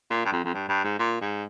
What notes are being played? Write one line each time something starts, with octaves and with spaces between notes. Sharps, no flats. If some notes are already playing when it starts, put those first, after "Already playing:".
A#2
G2
F2
F2
G2
G2
G#2
A#2
G#2